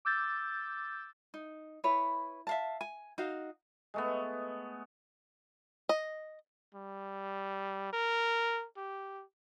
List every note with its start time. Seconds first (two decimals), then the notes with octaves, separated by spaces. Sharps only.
0.05 D6 E6 G6 A6
1.34 D#4
1.84 E4 B4 C#5
2.47 E5 F5 A5
2.81 G#5
3.18 D#4 F#4 F5
3.94 G#3 A3 B3
5.89 D#5
6.74 G3
7.93 A#4
8.77 G4